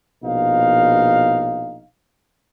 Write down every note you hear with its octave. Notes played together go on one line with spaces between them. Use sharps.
A#1 B2 D#4 F5